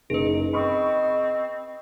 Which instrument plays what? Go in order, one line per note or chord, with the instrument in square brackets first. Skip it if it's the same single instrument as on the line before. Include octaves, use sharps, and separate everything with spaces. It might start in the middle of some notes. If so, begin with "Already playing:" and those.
[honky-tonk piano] F#1 [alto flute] D#4 [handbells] G#4 B4
[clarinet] C4 [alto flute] D#5 [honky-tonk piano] B5 C#6 D#6